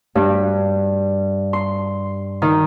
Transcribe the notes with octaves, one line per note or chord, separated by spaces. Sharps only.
G2
C6
D#3